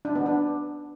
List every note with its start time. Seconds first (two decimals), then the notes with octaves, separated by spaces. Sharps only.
0.05 D4
0.15 B3
0.26 D4